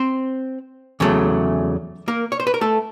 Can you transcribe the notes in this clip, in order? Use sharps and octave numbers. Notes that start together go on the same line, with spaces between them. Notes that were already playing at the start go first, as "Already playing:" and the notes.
Already playing: C4 C5
E2 C#3 F#3 A3
A#3 A#4
C#5
C5
B4
A#4
A3 A4